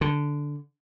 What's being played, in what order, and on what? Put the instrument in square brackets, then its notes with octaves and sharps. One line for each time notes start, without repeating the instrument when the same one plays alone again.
[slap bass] D3